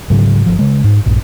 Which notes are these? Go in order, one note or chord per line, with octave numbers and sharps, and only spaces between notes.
G#2 C#3 F#3
G1 F3
C#3 G#3
G#2
A#1 G2